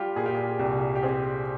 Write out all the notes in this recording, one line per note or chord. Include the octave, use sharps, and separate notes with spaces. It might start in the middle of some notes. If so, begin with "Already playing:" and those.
Already playing: G3 F4 G4
A#2 G#4
G4
G#4
C2 G4
G4
C4 G#4